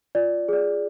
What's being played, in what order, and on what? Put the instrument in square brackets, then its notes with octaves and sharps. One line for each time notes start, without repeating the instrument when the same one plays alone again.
[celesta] F4 D5
G#4 D5